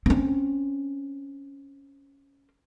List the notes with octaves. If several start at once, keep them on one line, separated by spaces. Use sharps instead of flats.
C4 C#4